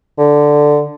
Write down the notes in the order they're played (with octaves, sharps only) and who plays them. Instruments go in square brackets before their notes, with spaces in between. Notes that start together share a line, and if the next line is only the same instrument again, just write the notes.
[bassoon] D3